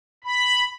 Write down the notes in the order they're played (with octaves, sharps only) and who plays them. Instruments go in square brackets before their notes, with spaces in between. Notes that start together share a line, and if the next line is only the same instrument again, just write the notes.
[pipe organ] B5